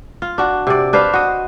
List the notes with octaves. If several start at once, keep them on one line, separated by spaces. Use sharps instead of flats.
F4
D4 F#4
C3 D5
D4 B4 C5 F5
F#4 D#5